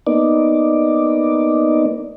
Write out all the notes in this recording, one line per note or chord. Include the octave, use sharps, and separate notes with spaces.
A#3 B3 D#4 D5